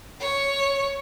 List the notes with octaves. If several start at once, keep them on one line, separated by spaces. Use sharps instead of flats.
C#5